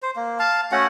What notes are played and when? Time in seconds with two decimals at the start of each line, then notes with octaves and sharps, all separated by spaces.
0.02 C5
0.16 A#3
0.39 F5 A5
0.72 A3 C#4 F#4 F#5